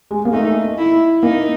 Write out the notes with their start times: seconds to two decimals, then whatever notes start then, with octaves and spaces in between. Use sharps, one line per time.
0.11 G#3
0.25 A#3
0.33 A3 D#4
0.78 E4
1.23 A#3 D#4